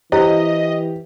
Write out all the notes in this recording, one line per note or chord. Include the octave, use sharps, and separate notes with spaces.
E3 E4 G4 C5 D#5